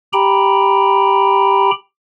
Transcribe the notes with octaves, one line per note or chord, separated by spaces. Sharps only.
G4 G5 A#5 B5